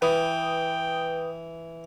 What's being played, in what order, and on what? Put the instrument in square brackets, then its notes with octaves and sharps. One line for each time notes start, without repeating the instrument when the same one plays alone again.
[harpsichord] E3 [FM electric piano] B4 D#6 [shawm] G5